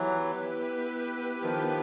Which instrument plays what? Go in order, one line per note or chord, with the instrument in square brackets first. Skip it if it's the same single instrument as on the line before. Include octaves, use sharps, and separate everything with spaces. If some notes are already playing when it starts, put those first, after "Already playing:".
Already playing: [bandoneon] E3 F#3 [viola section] B3 E4 G4 B4
[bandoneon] D#3 F3